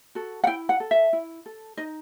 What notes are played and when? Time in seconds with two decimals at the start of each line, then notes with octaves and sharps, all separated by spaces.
0.15 F#4 A4
0.44 F#5
0.47 E4 G5
0.69 F#5
0.80 A4
0.91 E5
1.13 E4
1.46 A4
1.77 D#4 D#5